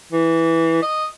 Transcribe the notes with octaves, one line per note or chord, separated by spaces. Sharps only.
E3
D#5